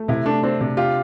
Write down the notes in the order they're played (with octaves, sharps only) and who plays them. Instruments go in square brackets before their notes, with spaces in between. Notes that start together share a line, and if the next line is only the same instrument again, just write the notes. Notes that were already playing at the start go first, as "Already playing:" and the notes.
Already playing: [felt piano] A3
[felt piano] C3 [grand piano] E4
[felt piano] A3 [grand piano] D4
[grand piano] C4 [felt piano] D4
[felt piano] C3
[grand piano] F4 [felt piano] G4